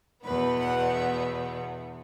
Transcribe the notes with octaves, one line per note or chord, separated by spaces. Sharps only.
E2 B2 B3 B4
F#5
E5